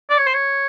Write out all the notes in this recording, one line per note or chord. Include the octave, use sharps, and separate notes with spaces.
D5
C#5
C5
C#5